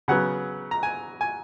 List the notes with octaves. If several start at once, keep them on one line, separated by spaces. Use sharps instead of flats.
C#3 F#3 B3 F#5
A#5
G#5
G#5